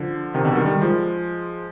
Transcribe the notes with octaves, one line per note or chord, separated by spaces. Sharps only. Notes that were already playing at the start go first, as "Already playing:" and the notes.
Already playing: D3 F3
C3 D#3
B2 D3
D#3 G3
D#3 G3
F3 G#3